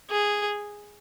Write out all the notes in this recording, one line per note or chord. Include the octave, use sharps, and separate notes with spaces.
G#4